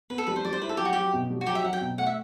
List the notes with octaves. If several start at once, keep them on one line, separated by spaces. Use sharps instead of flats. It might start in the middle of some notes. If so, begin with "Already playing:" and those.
B3 B4
A4
G3 B4
C5
G3 D5
C5
E4 B4
A4
F#3 G4
F#4
F#3 G4
B2
G3
F#4
F#3 G4
E5
F#3 F#5
G5
B2
A3 F#5
E5